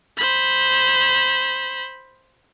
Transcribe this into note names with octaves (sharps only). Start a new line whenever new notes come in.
C5 B5